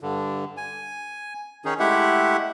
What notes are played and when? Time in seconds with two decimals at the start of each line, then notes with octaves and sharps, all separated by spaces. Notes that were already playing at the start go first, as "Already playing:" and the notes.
0.01 G2 D3
0.57 G#5
1.65 D#3 C#4 D#4 G#4
1.79 G#3 A3 E4 G4 E5 F#5